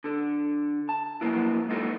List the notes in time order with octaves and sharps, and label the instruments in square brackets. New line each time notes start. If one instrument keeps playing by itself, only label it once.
[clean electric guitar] D3 A4
A5
F3 F#3 A#3 B3 E4
G#3 A#3 B3 D#4 F4 A4